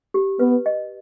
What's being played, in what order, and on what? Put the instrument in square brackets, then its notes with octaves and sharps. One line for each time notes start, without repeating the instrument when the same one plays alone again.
[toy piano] G4
[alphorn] B3 [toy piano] B4
[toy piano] D#5